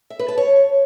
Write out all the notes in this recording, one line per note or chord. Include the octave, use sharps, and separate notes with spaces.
E5
B4
A5
C#5